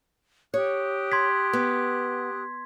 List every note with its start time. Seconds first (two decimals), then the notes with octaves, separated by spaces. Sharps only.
0.54 G4 C#5 D#6 F#6
1.12 C6 G#6 B6
1.53 B3